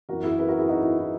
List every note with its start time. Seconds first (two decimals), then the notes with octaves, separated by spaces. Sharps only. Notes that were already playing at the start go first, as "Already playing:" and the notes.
0.09 F#2 E3 F#4 A#4
0.23 E4 G#4
0.39 G#4 B4
0.48 F#4 A#4
0.59 E4 G#4
0.69 D#4 F#4
0.83 E4
0.98 E4